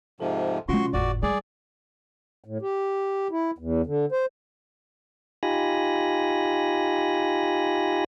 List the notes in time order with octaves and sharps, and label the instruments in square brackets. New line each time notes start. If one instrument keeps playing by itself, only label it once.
[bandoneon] G#2 C3 F3 [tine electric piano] A4
[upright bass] C3 F#3 [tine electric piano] C#4 F4 [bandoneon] F#4 C6 C#6
[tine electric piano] G1 A2 [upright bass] E2 [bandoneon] F#4 D5
[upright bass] G3 [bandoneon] G#4 D5
[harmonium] A2
G4
E4
E2
D3
C5
[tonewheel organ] D#4 F4 G4 G#5 B5 A#6